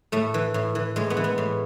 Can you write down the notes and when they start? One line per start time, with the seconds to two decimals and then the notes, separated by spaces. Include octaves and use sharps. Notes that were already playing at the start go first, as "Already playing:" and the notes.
0.12 A2 A3
0.34 E3
0.54 A2
0.75 E3
0.96 A2 G#3
1.10 B3
1.17 E3
1.24 B3
1.38 A2